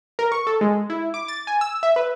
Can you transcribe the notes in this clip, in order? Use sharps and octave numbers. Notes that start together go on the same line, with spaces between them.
A#4
C#6
A4
G#3
E4
D6
A6
G#5
E6
E5
B4